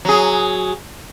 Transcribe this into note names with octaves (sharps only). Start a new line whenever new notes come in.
F#3 G#4